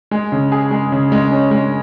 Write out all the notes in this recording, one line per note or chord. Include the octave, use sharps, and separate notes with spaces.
G#3
C#3
G#4
G#3
C#3
G#3
C#4
G#3